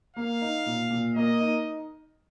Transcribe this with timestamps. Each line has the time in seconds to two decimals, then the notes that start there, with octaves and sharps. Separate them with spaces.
0.16 A#3 F5
0.41 D#4
0.66 A#2
0.90 A#2
1.15 A#3 D#5
1.40 D#4